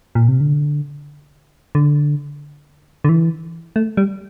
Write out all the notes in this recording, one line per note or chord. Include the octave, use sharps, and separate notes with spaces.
A#2
C3
D3
D3
D3
E3
A3
G3